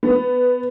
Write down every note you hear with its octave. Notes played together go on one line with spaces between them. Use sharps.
B3